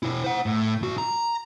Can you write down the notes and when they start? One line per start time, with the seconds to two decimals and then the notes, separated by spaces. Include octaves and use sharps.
0.03 B2 E4
0.24 C5 F#5
0.46 A2
0.82 B1 F#4
0.98 A#5